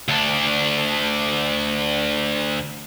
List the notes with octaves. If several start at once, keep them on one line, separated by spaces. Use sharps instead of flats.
D2 D4